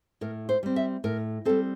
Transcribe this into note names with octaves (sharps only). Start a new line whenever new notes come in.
A2 A#4
C5
G3 C4
E5
A2 A#4
G3 C4 A4